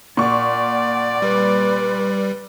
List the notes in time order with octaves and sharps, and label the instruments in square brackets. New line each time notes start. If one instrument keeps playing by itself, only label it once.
[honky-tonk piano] A#2 C#6 [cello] D5 [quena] F#5
[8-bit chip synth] G3 [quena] B4